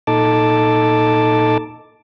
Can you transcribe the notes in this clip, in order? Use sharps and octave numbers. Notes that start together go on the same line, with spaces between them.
A#2 D#4 A4 A5 D6